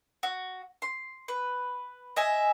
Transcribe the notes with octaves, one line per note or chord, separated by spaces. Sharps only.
F#4
C6
B4
D#5 E5 G#5